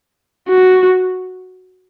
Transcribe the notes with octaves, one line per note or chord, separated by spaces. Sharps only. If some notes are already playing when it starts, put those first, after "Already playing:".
F#4